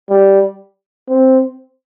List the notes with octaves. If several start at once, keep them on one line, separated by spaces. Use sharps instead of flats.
G3
C4